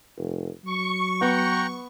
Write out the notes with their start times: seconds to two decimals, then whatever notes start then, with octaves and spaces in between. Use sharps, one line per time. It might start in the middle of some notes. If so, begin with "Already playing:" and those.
0.18 F1
0.64 F#3 C#6
1.21 B3 F#5 G5 A#5